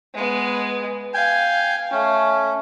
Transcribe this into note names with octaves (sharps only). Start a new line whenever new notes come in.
G#3 B3
F5 G5 G#5
A3 C#4